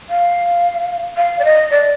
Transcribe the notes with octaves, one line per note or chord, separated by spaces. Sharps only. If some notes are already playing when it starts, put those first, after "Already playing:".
F5
F5
D5
D#5
D5